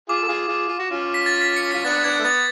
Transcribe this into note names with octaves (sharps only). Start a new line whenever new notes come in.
F4 G#4 D6
A4
F4 G#4
F4 G#4
F4
F#4
C#4 F4
B6
A6
B6
C#7
F4 B6
B3 D4 A6
B3 D4 G#6
A3
B3 A6